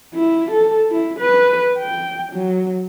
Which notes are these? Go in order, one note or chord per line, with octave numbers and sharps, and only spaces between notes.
E4
A4
E4
B4
G5
F#3